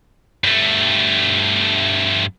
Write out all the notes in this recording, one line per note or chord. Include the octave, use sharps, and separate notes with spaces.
G2 A3